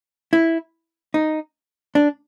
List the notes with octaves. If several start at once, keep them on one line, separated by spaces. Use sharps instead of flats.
E4
D#4
D4